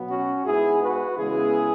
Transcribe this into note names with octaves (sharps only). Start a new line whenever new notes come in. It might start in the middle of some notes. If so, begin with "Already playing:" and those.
Already playing: B2 F#3 B3
C#4 F#4
G#2 G#3 B3 E4 G#4
F#4 B4
E2 C#3 G#3 B3 E4 G#4